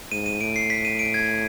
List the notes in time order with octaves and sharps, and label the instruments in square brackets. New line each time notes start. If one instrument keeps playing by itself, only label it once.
[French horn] G#2 [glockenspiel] D#7
[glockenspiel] D#7
[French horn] A2 [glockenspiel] D7
[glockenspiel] C7
B6
D#7
D7
G#6